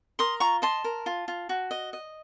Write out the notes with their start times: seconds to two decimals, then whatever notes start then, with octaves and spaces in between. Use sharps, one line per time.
0.19 A#4 C6 D#6
0.40 F4 A#5 C#6
0.62 D#5 A5 C6
0.84 A#4
1.06 F4
1.28 F4
1.49 F#4
1.71 D#5
1.93 D#5